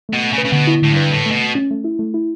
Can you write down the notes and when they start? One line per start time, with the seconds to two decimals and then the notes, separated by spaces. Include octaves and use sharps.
0.09 B2 A3
0.23 A3
0.33 C#3
0.38 B4
0.45 C#3
0.52 B2 D3
0.67 E4
0.82 A2 D3
0.91 G2 B4
1.11 A2 A3
1.26 A3
1.31 B2
1.40 A3
1.55 C#4
1.71 A3
1.84 E4
1.99 A3
2.14 E4